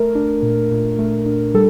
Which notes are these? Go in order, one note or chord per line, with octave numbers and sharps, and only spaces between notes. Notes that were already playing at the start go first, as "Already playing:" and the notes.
Already playing: A3 A#4
D4
A#2
A#2
A3
D4
G3 A4